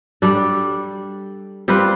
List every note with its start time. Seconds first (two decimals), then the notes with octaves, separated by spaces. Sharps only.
0.22 G3 D4 A4
1.68 G3 C4 F4 B4